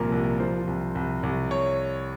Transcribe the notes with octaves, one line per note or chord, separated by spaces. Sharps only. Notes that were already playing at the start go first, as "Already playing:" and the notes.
Already playing: C2 A#2 F3 A#4
C2
F3 C5
C2
C2
C2
C#5